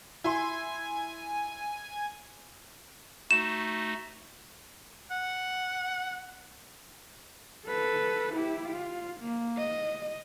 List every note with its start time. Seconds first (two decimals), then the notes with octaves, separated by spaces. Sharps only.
0.24 E4 G#5 C6
3.31 A3 D#4 F#4 E7
5.11 F#5
7.66 A4 B4
8.35 E4 G4
8.69 F4
9.20 A#3
9.57 D#5